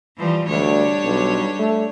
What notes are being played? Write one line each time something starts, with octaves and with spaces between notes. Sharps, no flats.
E3 F3 G3
D2 G3 D4 C#5
B1
A3